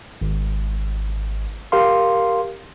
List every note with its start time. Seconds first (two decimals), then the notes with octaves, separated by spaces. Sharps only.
0.21 G#1
1.72 G4 A#4 F5 C6